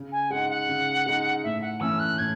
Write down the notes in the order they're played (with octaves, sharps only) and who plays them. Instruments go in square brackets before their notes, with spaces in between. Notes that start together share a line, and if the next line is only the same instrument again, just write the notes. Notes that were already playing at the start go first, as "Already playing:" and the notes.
Already playing: [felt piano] C#3
[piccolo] G#5
[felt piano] G#3 D#4 [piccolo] F#5
[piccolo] F#5
[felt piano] C#3
G#3 D#4
[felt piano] A2 [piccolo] E5
[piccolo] F#5
[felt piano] E3 A3 C#4 [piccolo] E6
[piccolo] F#6
[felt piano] A2 [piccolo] G#6